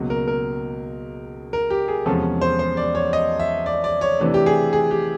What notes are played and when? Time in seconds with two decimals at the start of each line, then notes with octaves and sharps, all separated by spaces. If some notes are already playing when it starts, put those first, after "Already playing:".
Already playing: C#2 B2 F#3 A#3
0.10 A#4
0.28 A#4
1.53 A#4
1.70 G4
1.88 G#4
2.06 E2 C3 F3 G#3 C#4 A4
2.41 C5
2.59 C5
2.77 D5
2.95 C#5
3.13 D#5
3.40 E5
3.66 D5
3.84 D5
4.01 C#5
4.20 C3 E3 A3 D4
4.34 G4
4.46 G#4
4.73 G#4
4.91 G4